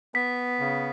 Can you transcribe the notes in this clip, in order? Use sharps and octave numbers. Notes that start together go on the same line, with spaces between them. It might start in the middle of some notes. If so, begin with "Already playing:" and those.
B3 B6
C#3